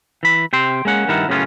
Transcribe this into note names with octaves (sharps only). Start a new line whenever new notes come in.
E3 B5
C3 G5 C6
G#3 A#3 C#4 F#5
G2 D#3 E4 A#4 F#5
F#2 A2 C#3 B3 C#4 F4